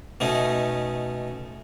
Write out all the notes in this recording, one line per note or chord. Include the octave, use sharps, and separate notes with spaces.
B2 A3 C#4 D#4